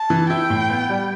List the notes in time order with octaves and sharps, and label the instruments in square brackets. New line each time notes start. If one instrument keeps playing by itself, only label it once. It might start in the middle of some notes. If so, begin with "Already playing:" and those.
Already playing: [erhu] A5
[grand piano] E3
[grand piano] E4 [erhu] G5
[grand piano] A2
B3
G3